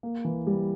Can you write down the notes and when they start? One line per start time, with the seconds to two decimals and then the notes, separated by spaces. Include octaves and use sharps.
0.03 A#3
0.25 E3
0.47 G3